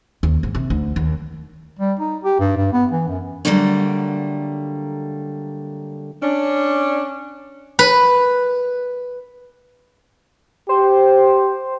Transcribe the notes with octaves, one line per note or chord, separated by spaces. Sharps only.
D#2
G#2
C3
D2
D#2
G3
D#4
G4
G2
G2
B3
E3
F#2
D3 F#3 G3 A3 A#3 C#4
C#4 D4
B4
G4 C5